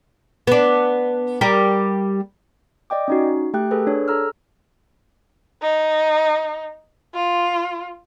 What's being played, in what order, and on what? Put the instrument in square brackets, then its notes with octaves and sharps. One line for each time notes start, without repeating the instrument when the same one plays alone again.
[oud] B3 D4
G3 G4 A#4
[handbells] D5 D#5 G5 D6
C#4 D#4 F#4
A3 G4 G5 F#6
G#4 A4 B4
D4 C#5
G#4 A4 A#5 E6 F6
[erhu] D#4
F4